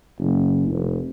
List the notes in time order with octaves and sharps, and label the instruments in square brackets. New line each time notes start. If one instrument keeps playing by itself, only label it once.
[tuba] F#1
F1